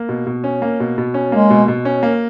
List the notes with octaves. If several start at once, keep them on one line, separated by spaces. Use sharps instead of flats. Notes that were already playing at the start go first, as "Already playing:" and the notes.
Already playing: A#3
B2
B2
C#4
A#3
B2
B2
C#4
G#3 A#3
B2
B2
C#4
A#3